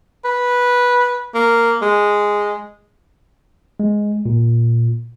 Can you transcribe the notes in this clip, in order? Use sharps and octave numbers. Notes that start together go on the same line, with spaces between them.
B4
A#3
G#3
G#3
A#2